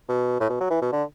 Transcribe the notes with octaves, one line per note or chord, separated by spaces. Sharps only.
B2
A2
B2
F#3
E3
B2
D3